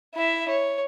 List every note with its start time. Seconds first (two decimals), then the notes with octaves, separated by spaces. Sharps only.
0.15 E4 E5
0.48 C#5